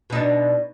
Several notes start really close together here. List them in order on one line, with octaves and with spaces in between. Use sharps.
B2 D#4 D4